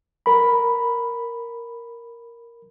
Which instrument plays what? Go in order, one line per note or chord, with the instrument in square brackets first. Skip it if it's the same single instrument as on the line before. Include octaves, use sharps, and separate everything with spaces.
[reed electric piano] A#4 B5